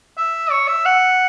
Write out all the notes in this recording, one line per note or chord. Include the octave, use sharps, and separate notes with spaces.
E5
C#5
E5
F#5